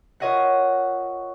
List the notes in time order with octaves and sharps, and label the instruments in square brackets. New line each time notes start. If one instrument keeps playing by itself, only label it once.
[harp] F4 A#4 C#5 D#5 E5 F#5